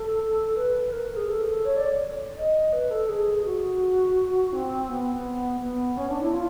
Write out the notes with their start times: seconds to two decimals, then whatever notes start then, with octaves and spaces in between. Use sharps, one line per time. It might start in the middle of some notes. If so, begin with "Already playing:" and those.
Already playing: A4
0.56 B4
0.92 A#4
1.16 G#4
1.28 A4
1.65 C#5
1.76 D5
2.37 D#5
2.73 B4
2.90 A4
3.09 G#4
3.45 F#4
4.53 C4
4.89 B3
5.61 B3
5.97 C#4
6.09 D4
6.21 E4
6.33 F4